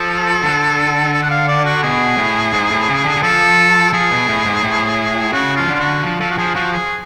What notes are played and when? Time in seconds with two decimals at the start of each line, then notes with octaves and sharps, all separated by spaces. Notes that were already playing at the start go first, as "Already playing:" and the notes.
Already playing: F3 A4
0.43 D3
1.13 A4
1.23 F#5
1.31 F5
1.48 D5
1.65 F#4
1.83 B2 G#4
2.18 A2
2.53 G#2
2.70 A2
2.88 C#3
3.05 D3
3.16 D3
3.23 F3 A4
3.93 F3 G#4
4.11 B2
4.28 A2
4.46 G#2
4.63 A2
5.33 C#3 F#4
5.56 F3 F4
5.68 D3
5.75 F4
5.79 F#4
6.03 F3
6.20 F3 A4
6.31 F#4
6.38 F3 G#4
6.55 F3 F#4
6.73 G#4